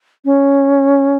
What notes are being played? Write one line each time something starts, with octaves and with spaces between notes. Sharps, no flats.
C#4